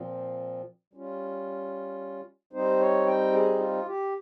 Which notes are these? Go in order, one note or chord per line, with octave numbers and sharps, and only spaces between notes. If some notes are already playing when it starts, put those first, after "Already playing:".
Already playing: A#2 F3 C4
G3 C#4 F4
G3 C4 D#4 C5
C#5
G5
G#4
F4
G4